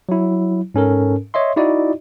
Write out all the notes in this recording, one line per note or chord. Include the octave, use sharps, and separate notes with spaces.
F#3 E4
G#2 C#4 A4 A#4
C#5 D#5 E5 C6
D#4 E4 F#4 D5 D#5